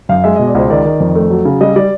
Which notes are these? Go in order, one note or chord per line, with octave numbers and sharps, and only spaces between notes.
F#2 F5
G#3 E5
B2 D#5
D5
C#2 C5
D#3 D5
D#3
F2
A3
F#3
C#3
G3 D#5
G3 D5